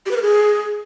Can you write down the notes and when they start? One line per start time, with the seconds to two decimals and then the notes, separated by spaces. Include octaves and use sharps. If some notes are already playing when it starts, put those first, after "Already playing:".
0.06 G4
0.11 B4
0.16 A#4
0.22 G#4